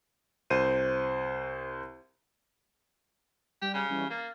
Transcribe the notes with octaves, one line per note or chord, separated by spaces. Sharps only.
C2 C5 D#7
G3 G4
C#3
E3 G3 C#4
A#3 A6